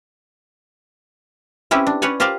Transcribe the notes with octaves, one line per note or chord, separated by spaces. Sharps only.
C4 C#4 E4 G4 B4
D4
C#4 B4 C#5 D5 F#5 G#5
F4 G4 A#4 C5 D5 F5